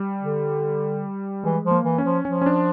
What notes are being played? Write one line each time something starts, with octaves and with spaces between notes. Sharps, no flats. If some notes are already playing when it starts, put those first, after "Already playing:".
Already playing: G3
D3
E3 G#3
F3
A#3
E3
C#4
F3
F3 C#4
C#4
D4